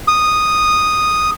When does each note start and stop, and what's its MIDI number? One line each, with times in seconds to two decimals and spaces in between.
0.08 1.30 87